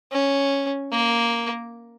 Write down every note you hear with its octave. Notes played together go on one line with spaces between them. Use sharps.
C#4
A#3